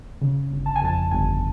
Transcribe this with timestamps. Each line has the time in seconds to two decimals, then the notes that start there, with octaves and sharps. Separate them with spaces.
0.21 C#3
0.51 G1
0.66 A5
0.76 G#5
0.82 F2 A5
1.11 G1 G#5